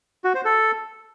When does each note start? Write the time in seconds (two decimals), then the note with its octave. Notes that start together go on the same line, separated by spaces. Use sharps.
0.24 F#4
0.35 C5
0.45 A4